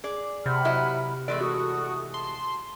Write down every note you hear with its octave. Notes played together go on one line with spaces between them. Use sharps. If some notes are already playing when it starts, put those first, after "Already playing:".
G#4 D5
C3 F#5 B5 F6
F#3 E4 D#5
E3 G#3 A3 A#4 D5
F#4 A4 C#6 D#6
A5 C6